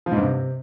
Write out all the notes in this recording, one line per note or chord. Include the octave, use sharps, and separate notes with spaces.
F3
G#2
G2
C3